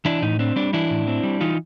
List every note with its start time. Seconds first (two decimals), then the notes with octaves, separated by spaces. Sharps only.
0.05 E3 D4 E4
0.22 A2 D#4
0.39 C4 D4
0.56 G3 D4
0.73 E3 D4 E4
0.90 A2
1.07 C4
1.23 G3
1.41 E3 D#4 F4